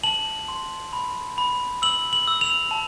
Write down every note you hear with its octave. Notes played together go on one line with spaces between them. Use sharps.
A5 F#7
C6
B5
B5
E6 F#7
F#7
E6
F7
A5